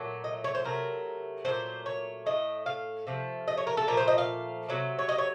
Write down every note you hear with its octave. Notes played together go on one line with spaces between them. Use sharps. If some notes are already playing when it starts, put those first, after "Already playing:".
Already playing: A#2 F#3 A3
D#5
C#5
C5
C3 F#3 A3 A#4
A#2 F#3 A3 C5
C#5
A2 A3 D#5
F5
C3 F3 A3
D#5
C#5
A#4
A4
A#2 F3 A3 A#4
C5
D#5
F5
C3 F#3 A3
C#5
D#5
C#5